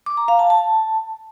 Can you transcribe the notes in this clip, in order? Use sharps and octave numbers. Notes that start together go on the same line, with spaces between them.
D6
A#5
F5
A5
A5